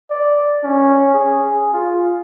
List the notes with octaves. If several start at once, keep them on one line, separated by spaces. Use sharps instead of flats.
D5
C#4
G#4
F4